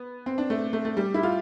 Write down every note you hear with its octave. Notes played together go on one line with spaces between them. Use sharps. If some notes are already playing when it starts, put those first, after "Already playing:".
Already playing: B3
C4
D4
A3
A3
A3
G3
E4
F4